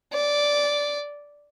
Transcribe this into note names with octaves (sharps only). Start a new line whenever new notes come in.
D5